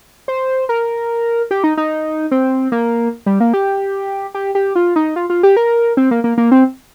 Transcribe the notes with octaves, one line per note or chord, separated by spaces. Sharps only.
C5
A#4
G4
D#4
D#4
C4
A#3
G3
A#3
G4
G4
G4
F4
D#4
F4
F4
G4
A#4
C4
A#3
A#3
A#3
C4